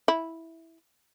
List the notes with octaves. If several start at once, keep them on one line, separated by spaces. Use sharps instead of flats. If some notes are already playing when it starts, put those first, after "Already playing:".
E4